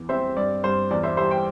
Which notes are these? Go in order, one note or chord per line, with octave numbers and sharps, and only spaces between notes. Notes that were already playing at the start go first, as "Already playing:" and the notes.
Already playing: E2
C4 C5 E5
G2 D5
G2 C5
E2 D5
C5 E5
G3 C5 E5
G5 C6